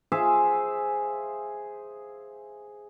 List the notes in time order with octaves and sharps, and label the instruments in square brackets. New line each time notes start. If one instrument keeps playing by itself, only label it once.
[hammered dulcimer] G#4 C5 E5 F5